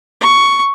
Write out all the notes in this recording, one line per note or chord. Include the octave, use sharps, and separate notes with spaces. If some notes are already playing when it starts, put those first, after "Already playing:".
C#6